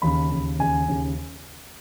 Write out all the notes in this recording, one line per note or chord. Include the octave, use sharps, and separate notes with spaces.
D#2 C#3 B5
D#2 C#3
D#2 C#3 G#5
D#2 C#3